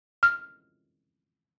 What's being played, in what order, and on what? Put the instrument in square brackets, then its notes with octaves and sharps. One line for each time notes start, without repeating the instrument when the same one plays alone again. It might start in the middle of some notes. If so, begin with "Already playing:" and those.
[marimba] F6